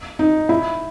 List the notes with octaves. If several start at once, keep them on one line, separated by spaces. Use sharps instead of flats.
D#4
E4